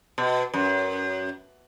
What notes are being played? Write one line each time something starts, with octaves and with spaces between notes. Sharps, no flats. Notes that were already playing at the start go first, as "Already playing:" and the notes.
B2
F#2